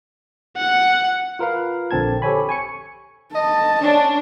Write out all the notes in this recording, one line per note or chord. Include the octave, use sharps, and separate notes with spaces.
F#5
F4 A#4 B4 F5
A#1 D3 C4 A5 G#6
G4 A4 C5 C#5 G#5 B5
G#5 C#6 C#7
D#5 A5
C#4 D4